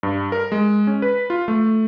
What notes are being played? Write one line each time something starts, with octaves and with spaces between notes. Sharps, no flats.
G2
A#4
G#3
C#4
B4
F4
A3